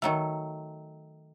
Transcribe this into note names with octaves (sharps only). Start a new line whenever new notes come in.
D#3 F#3 A3